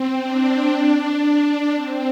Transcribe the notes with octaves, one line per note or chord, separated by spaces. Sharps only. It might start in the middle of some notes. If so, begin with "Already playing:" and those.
Already playing: C4
D4
C4